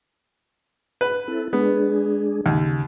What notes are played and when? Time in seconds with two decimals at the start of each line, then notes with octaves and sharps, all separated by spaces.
1.01 B4
1.28 C4 E4 A4
1.53 G#3 B3 D4 G#4
2.46 D#2 C#3